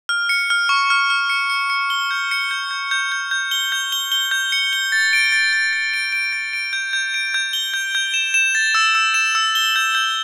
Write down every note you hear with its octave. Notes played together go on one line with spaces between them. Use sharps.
F6
C#7
F6
C#6
F6
F6
C#7
C#7
C#7
G7
G6
C#7
G6
G6
G6
G6
G6
G7
G6
G7
G7
G6
C#7
G7
A6
D7
A6
A6
A6
D7
D7
A6
D7
G6
G6
D7
G6
G7
G6
G6
E7
E7
A6
E6
E6
E7
E6
G7
G6
G6